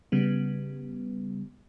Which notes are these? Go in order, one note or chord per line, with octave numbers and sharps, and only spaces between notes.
C#3 G3 B3